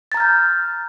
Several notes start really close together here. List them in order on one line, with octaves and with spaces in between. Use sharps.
A6 A#5 F6 G6